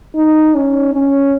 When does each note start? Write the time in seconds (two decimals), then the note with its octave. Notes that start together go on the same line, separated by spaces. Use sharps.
0.15 D#4
0.55 C#4
0.94 C#4